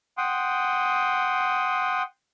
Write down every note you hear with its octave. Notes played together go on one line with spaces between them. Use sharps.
F#5 G5 C6 D#6